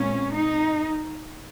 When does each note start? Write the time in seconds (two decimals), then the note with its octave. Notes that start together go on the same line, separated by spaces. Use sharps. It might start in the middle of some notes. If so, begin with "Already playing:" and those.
Already playing: A#2 G#3 C4 C#4
0.36 D#4